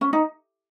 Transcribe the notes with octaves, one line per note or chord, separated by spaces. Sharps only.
C#4
D#4